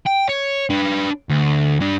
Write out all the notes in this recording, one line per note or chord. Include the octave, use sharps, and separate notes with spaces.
G5
C#5
D4 B4
D2
G2 D4